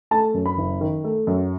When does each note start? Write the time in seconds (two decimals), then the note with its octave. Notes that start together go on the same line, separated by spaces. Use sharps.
0.11 A3 A5
0.34 F#2
0.46 B5
0.58 F#1
0.81 D#3
1.04 A3
1.27 F#2